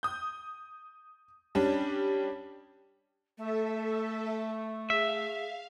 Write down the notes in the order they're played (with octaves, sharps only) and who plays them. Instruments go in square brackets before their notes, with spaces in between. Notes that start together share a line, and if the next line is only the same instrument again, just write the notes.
[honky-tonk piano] D#6 G6
G3 C#4 D4
[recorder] A3 [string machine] A4 E5
[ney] G#4 [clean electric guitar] E5 [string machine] F5